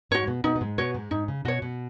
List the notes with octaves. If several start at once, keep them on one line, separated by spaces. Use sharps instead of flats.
G#2 G#3 F#4 C#5
G#3
B2 B3
B2 B3 D#4
B3
G#2 G#3
B2 B3 F#4 C#5
G#2 G#3
G#2 D#4
C#3
B2 F#4 C#5
B2